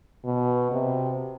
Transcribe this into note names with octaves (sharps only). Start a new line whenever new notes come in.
B2
C3